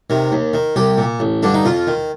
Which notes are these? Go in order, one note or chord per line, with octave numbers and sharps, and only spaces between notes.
C3 D#3
D#2
D#3
C2 G4
A#2
A1
G2 D3 D4
D#4
F2 F4
D#3